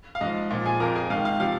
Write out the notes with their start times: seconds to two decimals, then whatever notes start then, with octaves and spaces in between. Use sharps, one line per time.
0.15 F5
0.21 G#2 F3 D#5
0.50 A#2 F3
0.66 G#4 G#5
0.80 F2 F3 A#4 A#5
0.95 G#4 G#5
1.10 G#2 D#3 F5
1.25 F5
1.40 C3 F3 F5